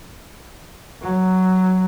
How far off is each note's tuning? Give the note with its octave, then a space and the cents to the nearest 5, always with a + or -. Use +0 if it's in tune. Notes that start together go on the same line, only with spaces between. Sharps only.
F#3 +5